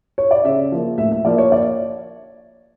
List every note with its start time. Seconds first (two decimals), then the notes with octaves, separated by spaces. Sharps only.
0.18 C#5
0.31 D5
0.44 C#3 E5
0.72 F3 A#3
0.98 A2 E5
1.12 E5
1.25 F3 A#3 D5
1.38 C#5
1.52 D5